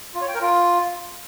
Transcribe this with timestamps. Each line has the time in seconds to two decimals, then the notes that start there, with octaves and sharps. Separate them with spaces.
0.15 F4
0.21 C#5
0.28 G5
0.35 A#4
0.41 F4